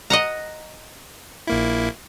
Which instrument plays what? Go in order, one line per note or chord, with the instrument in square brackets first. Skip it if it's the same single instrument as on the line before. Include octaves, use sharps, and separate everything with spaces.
[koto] D#5 F#5 A#5
[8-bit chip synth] A#1 A#3 E4